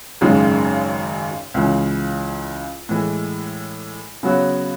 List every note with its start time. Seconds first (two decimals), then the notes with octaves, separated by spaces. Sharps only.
0.21 G#1 F#2 C#3 G#3 D#4
1.54 C#2 C#3 E3
2.89 A2 E3 G#3
4.23 C#3 F#3 B3 F#4 C#5